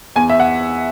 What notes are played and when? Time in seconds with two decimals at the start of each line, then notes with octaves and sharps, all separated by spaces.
0.16 E2 G#5
0.30 E5
0.40 F#5